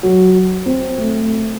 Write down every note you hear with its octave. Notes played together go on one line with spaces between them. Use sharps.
F#3
C4
A3
A3